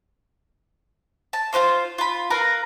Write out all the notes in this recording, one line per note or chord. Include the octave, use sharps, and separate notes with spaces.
A5
F4 G4 C5 F5
F4 B5
A#4 B4 F5 A#5